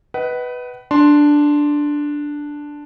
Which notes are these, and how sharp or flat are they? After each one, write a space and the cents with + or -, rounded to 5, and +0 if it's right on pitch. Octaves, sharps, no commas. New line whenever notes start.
B4 +0 D#5 +25 F#5 +40
D4 +0 C6 +0